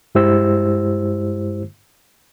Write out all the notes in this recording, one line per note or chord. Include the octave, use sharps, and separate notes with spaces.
G2 G#3 E4 G4 C5 E6